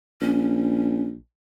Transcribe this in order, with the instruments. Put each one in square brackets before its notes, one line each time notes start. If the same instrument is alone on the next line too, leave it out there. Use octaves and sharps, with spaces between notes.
[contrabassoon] A#1 [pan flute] C#4